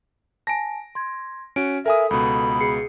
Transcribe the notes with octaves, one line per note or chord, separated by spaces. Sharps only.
G#5 A5 A#6 D7
C6 G#6
C#4 F#4 D7
A4 A#4 E5 G#5 D#6
C#2 B2 B5
G#4 C7 C#7